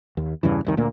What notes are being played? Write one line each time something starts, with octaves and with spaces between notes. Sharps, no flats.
D#2
E2 G2 C#3 E3
F1 C2 D#3
D2 A#2 A#3